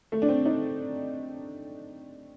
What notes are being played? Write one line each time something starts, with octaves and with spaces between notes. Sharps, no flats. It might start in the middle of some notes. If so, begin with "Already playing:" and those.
A3
D4
C4
D#4